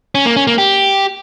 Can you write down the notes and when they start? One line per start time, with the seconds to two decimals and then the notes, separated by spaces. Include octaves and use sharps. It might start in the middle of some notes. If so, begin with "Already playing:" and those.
0.15 C#4
0.26 A#3
0.36 C#4
0.47 A#3
0.58 G4